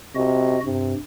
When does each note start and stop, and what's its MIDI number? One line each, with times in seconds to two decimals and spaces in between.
0.15 0.59 48
0.15 0.60 66
0.15 0.60 75
0.65 0.94 43
0.65 0.95 48